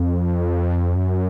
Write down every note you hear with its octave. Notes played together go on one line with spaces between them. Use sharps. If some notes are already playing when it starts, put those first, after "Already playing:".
Already playing: F2
F#2